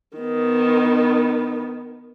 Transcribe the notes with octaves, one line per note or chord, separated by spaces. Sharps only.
D#3 B3